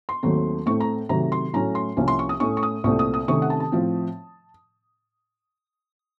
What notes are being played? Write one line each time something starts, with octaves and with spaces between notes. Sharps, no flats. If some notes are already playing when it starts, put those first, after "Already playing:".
C6
D#2 D#3 F#3 A3 C4
A2 A3 C4 C#6
A#5
C3 D#3 F#3 A3 A#5
C6
A2 F#3 A3 C#4 A#5
C6
C2 C3 F3 A#3 C#4
C6
C#6
D#6
A2 A3 C#4 C#6
C#6
D#6
C2 A#2 A3 C4 C#6
D#6
D#6
C3 D#3 A3 C#4 C#6
F#5
A5
A5
A2 F3 C4